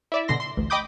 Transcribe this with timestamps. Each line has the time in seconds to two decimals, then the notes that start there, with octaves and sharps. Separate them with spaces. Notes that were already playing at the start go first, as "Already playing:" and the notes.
0.12 E4 D5 E5
0.28 B2 D3 C6 A#6
0.40 C6
0.57 A1 D2
0.70 D#5 G5 B5 D6 D#6 G6